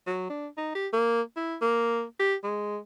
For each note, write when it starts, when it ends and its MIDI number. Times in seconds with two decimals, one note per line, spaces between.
0.07 0.29 54
0.30 0.47 62
0.57 0.71 63
0.75 0.87 67
0.93 1.21 58
1.36 1.56 64
1.61 2.02 58
2.19 2.34 67
2.43 2.78 56